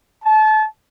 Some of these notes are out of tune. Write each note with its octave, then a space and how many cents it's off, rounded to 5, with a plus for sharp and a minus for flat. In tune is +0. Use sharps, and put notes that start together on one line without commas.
A5 -30